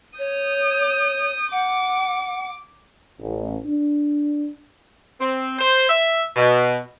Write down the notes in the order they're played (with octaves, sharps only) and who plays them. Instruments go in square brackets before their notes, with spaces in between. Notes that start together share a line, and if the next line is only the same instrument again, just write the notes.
[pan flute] C#5 [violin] D#6 G6
[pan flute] F#5 [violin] D6
[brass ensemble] A1
D4
[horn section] C4
C5
E5
B2